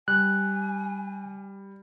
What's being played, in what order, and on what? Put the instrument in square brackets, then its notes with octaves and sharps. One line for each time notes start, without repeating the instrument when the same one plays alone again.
[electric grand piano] G3 [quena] G#5 [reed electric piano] F#6